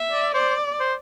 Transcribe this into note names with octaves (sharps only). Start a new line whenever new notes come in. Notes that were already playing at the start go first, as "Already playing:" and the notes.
Already playing: E5
D5
C5 D5
C5